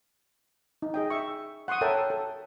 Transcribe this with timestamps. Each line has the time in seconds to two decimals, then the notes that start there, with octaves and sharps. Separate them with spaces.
0.82 D#4
0.94 G#4 D#5 G5
1.10 E5 C#6
1.68 F#5 C6 C#6 D#6
1.81 A4 A#4 C#5 E5 G5 A5
2.10 A4